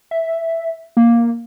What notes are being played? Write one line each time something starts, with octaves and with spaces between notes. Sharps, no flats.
E5
A#3